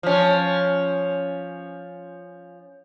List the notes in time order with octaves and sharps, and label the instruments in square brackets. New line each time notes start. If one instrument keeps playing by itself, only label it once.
[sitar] F3 C#4